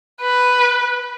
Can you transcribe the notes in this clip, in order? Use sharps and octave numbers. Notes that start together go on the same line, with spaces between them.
B4